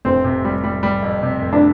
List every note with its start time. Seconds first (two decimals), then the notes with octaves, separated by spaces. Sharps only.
0.05 F1 C4
0.24 C3
0.45 G3
0.64 G3
0.83 G3
1.03 F2
1.23 C3
1.42 F1
1.53 D4